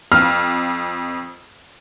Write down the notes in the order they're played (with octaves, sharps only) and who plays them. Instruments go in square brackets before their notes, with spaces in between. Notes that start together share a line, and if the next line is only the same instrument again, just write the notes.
[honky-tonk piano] F2 [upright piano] F6